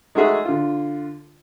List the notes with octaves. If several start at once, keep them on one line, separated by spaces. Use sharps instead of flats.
G#3 A3 D#4 F#4 G#4 E5
D3 F4